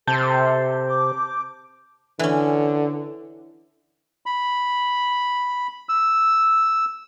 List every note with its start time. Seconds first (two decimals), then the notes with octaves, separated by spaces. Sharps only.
0.07 C3 A4 C5 A5 G6
0.86 D6
2.19 D3 E3 C#4
4.26 B5
5.89 E6